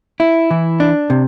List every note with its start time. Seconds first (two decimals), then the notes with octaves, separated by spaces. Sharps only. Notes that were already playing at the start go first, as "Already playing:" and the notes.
0.20 E4
0.51 E3
0.80 D4
1.10 C3